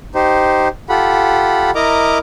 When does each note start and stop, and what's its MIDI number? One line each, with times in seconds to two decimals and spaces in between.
0.15 0.68 63
0.15 0.68 67
0.15 0.68 72
0.89 1.71 65
0.89 1.71 67
0.89 1.71 69
0.89 1.71 78
0.89 1.71 83
1.75 2.18 64
1.75 2.18 70
1.75 2.18 75
1.75 2.18 82
1.75 2.18 86